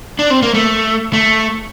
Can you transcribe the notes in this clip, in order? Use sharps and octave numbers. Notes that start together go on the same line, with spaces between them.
D4
C4
A#3
A3
A3